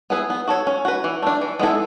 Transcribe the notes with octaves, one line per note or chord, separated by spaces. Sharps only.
B3 E4 G#4 B4
B3
F#4 A4 C#5
C#4
F#4 B4
E3
A3 D4
E3
G#3 B3 E4 A4